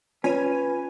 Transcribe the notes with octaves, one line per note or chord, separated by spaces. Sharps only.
C#4 F4 B4 G#5 D#7